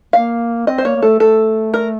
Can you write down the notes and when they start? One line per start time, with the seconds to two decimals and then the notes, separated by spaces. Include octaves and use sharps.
0.13 A#3 F5
0.67 C4 D#5
0.78 C5
0.85 A#3 C#5
0.96 A#3
1.02 A3 A4
1.20 A3 A4
1.74 A#4